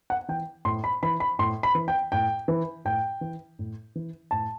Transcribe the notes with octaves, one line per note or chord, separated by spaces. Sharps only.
F#5
E3 G5
A2 C6
B5
E3 B5
B5
A2 C6
B5
E3
G5
A2 G5
E3
A2 G5
E3
A2
E3
A2 A5